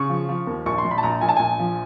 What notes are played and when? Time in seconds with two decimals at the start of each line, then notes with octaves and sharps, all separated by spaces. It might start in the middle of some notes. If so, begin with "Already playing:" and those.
Already playing: C#3 C#6
0.10 F3
0.29 F3
0.47 D#2
0.66 A#1 C#6
0.78 C6
0.85 A#1
0.91 B5
0.98 A5
1.03 A#1 A#5
1.21 A#1 G#5
1.29 A5
1.37 A#1 G#5
1.59 F3